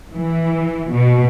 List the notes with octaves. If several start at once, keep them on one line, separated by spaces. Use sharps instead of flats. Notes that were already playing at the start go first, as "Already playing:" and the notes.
E3
B2